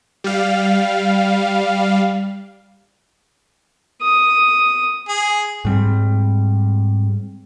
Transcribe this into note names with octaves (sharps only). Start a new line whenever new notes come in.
G3 F5
D#6
G#4
G#2 G3 C4